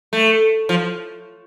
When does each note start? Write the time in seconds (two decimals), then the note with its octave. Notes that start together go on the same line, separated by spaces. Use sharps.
0.13 A3
0.69 F3